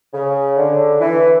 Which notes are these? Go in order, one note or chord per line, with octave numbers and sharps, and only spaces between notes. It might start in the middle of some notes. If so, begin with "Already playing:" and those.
C#3
D3
E3